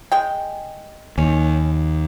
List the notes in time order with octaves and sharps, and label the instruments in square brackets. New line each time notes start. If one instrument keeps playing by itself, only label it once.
[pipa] G#3 G#4 G5
[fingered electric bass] D#2 [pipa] C#4